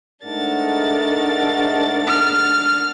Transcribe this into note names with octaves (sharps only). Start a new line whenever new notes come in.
G#2 A3 D4 D#4 A#4 D5 F#5 A6
F6